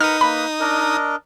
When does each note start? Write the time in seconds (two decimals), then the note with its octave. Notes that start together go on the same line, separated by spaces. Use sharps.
0.01 D#4 A#4 B4 F#5 D#6 F6
0.21 A#3 B4 B5
0.60 D4 A#4 D#5